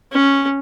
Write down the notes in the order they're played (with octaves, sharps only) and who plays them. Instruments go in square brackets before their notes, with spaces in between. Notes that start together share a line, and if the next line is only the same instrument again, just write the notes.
[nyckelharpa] C#4